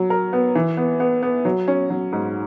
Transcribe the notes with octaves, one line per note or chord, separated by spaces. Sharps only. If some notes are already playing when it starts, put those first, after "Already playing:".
Already playing: F#3
A#4
B3
E3
B3
B3
B3
F#3
C#4
F#3
G#2